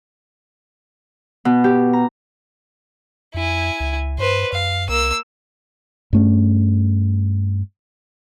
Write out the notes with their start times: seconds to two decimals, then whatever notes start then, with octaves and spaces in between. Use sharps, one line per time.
1.45 B2
1.64 G4
1.93 A#5
3.34 F2 E4 G#5
3.80 C#2
4.18 G2 B4 C5
4.52 F#2 F5
4.89 C2 A#3 E6
6.13 G2 A3 C#4